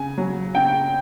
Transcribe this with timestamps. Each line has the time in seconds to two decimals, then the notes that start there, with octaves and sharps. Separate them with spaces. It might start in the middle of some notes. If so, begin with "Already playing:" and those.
Already playing: C#3 G#5
0.18 F#3
0.55 C#3 G5